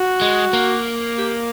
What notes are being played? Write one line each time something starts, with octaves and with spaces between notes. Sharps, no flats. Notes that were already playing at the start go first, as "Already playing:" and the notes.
Already playing: F#4
G#3
A#3
G4